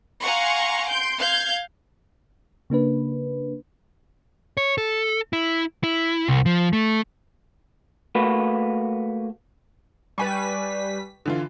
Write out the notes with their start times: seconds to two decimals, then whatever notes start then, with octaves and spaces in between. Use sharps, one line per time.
0.22 F5 F#5 G#5 A#5 C6 C#6
0.88 C6 G6 D7
1.20 F5 G6 G#6
2.70 C#3 A#3 D4 B4
4.57 C#5
4.78 A4
5.33 E4
5.84 E4
6.29 C2
6.46 F3
6.73 A3
8.15 A3 A#3 F#4 B4
10.18 G3 B4 G#5 C#6 B6
11.26 D3 E3 F4